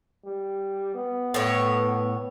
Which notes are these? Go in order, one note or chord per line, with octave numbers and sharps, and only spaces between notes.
G3
B3
A2 C#5